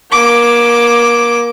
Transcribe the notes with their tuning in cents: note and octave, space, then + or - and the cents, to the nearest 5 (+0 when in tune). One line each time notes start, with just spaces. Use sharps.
A#3 +30 D6 +0